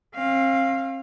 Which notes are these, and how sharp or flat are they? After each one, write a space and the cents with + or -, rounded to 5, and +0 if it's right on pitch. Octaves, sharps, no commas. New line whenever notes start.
C4 +40 F5 +0